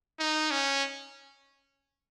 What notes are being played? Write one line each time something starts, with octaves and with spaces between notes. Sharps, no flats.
D#4
C#4